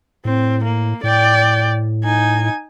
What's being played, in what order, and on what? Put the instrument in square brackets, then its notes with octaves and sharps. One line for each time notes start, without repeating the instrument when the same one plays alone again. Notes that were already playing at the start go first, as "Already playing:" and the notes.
[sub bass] A2 [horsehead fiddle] C4
[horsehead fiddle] A#3
[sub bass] A2 [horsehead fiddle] D5 G5
[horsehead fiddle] D#4 G#5